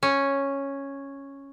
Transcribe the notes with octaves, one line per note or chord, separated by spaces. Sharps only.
C#4